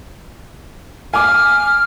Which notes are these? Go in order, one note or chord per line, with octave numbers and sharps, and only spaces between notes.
G#5 D6 F6